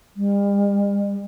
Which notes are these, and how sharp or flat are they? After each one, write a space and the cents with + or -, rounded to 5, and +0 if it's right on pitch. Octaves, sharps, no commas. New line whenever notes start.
G3 +45